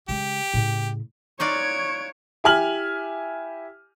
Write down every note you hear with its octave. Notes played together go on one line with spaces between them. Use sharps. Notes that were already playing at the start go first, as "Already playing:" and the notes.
C#3 G#3 G4
A2 C#3
D#4 F4 C#5 D5 C#6 F#6 G#6 D7
E4 G4 G#5 F6 F#7